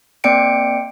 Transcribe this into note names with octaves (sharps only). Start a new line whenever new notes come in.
A#3 C4 D5 G5 C#7 D7